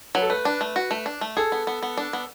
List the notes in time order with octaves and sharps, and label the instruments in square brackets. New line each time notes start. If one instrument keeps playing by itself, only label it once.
[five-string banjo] F#3 [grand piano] B4
[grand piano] A4
[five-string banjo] A3 [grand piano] B4
[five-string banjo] D4
A3
F#4
A3
D4
A3
[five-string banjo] G#4 [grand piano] A4
[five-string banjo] B3
B3
B3
D4
B3